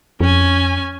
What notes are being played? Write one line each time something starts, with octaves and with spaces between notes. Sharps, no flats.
F2 C#4 G#5